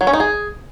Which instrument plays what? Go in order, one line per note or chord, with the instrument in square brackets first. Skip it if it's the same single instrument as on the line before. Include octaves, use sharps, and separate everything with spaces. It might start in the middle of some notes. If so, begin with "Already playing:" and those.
[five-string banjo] F#3
C#4
D#4
G#4